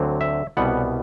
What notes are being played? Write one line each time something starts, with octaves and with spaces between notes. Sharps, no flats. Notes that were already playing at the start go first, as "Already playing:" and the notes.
Already playing: D2 D3 F#3 C4
E5
C2 B2 G3 B3 F#5